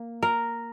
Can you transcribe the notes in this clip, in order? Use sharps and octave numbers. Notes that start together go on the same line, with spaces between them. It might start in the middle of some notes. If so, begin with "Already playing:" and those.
Already playing: A#3
A#4